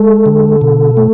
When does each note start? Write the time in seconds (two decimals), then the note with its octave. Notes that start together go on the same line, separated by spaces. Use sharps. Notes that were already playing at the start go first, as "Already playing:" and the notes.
Already playing: G#3 A4
0.26 D3
0.61 B2
0.97 A3